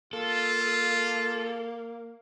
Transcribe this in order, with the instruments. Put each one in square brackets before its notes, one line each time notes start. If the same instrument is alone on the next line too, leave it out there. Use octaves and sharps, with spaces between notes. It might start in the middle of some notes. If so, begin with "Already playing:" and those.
[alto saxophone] A#3 [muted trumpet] F4 [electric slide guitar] A4